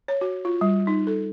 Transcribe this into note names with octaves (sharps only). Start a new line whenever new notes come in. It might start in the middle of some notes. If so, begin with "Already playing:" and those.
C#5
F#4
F4
G3
D#4
A4